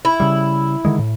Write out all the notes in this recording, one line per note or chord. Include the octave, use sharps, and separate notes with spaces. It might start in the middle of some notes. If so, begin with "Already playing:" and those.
E4
C#3 G3
D3 D#3 G#3
A2